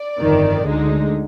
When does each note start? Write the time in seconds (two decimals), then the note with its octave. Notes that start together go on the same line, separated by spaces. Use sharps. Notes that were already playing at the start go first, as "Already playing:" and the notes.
Already playing: D5
0.19 G1 F2 D#3
0.64 D2 D3 G#3 D#4